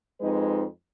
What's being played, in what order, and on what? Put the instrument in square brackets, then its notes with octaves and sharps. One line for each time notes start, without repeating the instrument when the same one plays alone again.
[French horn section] F2 G#3 D#4 B4